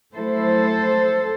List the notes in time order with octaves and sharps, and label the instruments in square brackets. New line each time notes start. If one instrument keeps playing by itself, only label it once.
[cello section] F#3 A3 E4 A4 C5